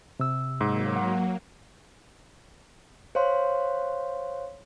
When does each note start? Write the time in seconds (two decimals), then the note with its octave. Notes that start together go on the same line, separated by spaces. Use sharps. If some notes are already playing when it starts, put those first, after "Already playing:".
0.20 C3 E6
0.61 G#2 F#3 A#3
0.96 F#5
3.15 C5 C#5 F5 C6